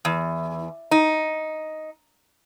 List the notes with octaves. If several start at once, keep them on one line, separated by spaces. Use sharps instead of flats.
E2
D#4